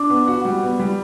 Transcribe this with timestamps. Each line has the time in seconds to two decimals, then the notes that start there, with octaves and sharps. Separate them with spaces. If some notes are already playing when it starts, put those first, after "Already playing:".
Already playing: D4 D6
0.10 B3
0.28 F#4
0.45 G3
0.63 B3
0.80 G3